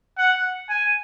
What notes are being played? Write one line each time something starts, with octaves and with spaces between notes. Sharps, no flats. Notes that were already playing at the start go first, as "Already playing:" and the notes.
F#5
G#5